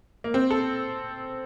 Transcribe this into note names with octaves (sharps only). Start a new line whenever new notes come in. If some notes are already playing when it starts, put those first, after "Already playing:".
A#3
C4
A4